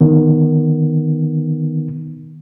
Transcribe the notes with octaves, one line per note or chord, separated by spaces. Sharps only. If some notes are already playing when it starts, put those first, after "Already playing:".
D#3 B3